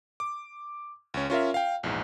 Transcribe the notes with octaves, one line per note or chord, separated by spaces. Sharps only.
D6
C#2 C#4
C#4 F4 A#4 E5
F5 G5
A#1 E2 G#2